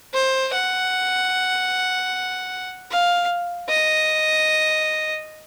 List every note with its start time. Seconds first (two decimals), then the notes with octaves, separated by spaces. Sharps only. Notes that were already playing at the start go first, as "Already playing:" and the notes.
0.14 C5
0.54 F#5
2.91 F5
3.69 D#5